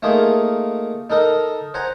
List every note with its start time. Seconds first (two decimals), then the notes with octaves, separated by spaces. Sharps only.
0.03 A3 A#3 D#4 F4 G#4
1.10 D#4 A4 A#4 D#5
1.74 C5 F#5 G#5 A#5